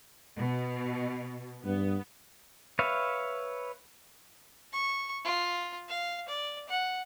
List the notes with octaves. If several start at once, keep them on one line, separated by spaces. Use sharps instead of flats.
B2
G2 B3
B4 C#5 E5 F5
C#6
F4
F5
D5
F#5